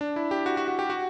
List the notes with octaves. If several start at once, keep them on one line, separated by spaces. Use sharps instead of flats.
D4
E4
G4
F#4
F#4
F#4
G4
F#4